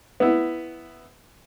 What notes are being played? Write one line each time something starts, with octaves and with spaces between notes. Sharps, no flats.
B3 E4